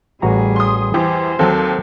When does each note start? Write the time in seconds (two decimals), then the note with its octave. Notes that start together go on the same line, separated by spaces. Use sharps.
0.22 A1 G3 F#4 G#4 A#5
0.56 C6 D#6
0.94 E2 E3 G4 C5
1.39 D#2 F#3 C4 A4